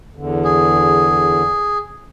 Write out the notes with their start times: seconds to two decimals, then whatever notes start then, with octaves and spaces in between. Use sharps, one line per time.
0.16 E2 D3
0.44 G#4